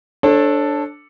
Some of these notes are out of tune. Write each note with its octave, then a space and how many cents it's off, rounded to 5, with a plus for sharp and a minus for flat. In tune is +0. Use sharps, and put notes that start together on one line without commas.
D4 +0 A4 +0 C#5 -40